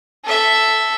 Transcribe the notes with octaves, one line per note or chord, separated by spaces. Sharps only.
A4 E5